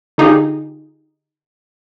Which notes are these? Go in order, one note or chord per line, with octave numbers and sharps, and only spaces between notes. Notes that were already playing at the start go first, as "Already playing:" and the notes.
D3 D#4 F4 G4 G#4